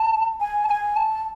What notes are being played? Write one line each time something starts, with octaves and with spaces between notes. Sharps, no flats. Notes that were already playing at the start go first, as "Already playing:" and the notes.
Already playing: A5
G#5
A5
G#5
A5